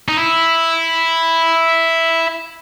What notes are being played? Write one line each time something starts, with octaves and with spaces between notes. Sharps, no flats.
D#4
E4